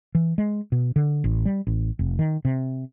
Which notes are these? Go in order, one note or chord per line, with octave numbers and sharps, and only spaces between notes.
E3
G#3
B2
D3
A1
G3
A1
F1
D#3
C3